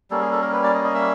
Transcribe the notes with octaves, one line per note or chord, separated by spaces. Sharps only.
G3 A#3 C#4 A4
G#4
A4
A#4
B4
D5
D#5
D#5
E5